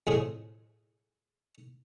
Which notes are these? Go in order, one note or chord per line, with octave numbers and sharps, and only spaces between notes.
F2 A2 G#4